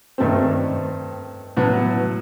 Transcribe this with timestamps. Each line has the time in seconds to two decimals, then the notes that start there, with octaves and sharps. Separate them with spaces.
0.18 G2 D#3 A3 C4
1.57 A2 F#3 B3 F#4